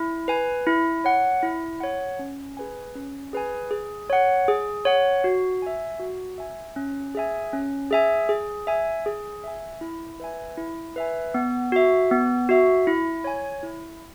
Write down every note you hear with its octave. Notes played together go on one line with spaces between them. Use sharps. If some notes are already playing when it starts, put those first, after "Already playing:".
Already playing: E4
B4 G#5
E4
C#5 F#5
E4
C#5 F#5
C#4
G#4 B4 G#5
C#4
G#4 B4 G#5
G#4
C#5 F#5
G#4
C#5 F#5
F#4
E5 G#5
F#4
E5 G#5
C#4
G#4 E5 G#5
C#4
G#4 E5 G#5
G#4
E5 G#5
G#4
E5 G#5
E4
B4 E5 G#5
E4
B4 E5 G#5
B3
F#4 E5
B3
F#4 E5
E4
C#5 G#5
E4